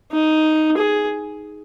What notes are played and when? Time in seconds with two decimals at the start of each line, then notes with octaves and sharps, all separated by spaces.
0.12 D#4
0.77 G#4